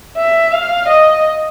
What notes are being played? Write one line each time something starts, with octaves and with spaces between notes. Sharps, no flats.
E5
F5
D#5